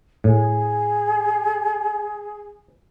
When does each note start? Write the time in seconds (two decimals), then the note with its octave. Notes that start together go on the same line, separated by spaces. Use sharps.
0.24 A2 G#4